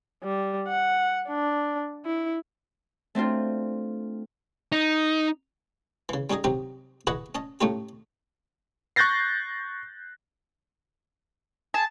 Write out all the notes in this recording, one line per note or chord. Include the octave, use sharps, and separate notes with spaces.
G3
F#5
D4
E4
A3 C4 D4 F4
D#4
C#3 E3
G3 C#4 D#4 G#4 D#5
C3 F#3 C4 D#4 G4
E4 F#4 G#4 B4 D#5 F#5
C#4 D#5 A5
A2 A3 C#4 D#4 F4 G4
C#6 F#6 G6 A6 A#6 C7
G#4 A5